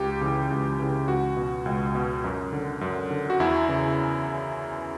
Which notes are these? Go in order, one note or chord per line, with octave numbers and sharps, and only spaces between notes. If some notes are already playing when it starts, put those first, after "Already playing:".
Already playing: C#2 G4
C#3 E3
C#2
C#3 E3
C#2 F#4
B2
C#2
B2
F#2
D3
F#2
D3
F#4
E2 E4
C#3 E3